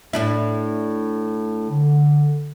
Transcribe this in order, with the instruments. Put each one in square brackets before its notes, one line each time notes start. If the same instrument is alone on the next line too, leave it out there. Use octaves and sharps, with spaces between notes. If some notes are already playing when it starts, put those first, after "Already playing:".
[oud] A2 D4 E4
[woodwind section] D3